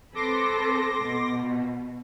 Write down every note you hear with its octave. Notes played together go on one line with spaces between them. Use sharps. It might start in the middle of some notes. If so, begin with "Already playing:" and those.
C4 A4 B4 C6 D6 A#6
B2